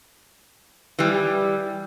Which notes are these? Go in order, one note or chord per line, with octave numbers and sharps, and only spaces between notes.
E3 G3